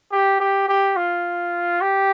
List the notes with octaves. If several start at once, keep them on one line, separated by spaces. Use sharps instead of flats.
G4
G4
G4
F4
G4